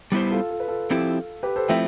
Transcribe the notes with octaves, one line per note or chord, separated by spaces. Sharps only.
G3 B3 E4 G4 C5
F4 A4
A4
B4
F4 A4
F3 C4 E4 G4
G4 B4
A4 C5
F3 A3 C4 E4 E5 G5